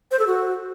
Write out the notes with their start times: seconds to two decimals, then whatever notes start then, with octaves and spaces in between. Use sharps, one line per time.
0.11 C5
0.19 A4
0.27 F#4